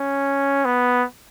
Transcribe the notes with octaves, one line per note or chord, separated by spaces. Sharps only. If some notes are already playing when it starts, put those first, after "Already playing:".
Already playing: C#4
B3